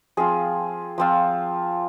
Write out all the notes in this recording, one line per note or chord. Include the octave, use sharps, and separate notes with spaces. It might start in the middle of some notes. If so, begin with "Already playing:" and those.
F3 C4 F4 G#4
F3 C4 F4